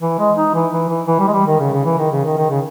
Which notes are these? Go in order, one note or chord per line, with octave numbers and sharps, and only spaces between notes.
E3
G#3
D#4
E3
E3
E3
E3
G3
G#3
G3
D#3
C#3
C#3
E3
D#3
C#3
D#3
D#3
C#3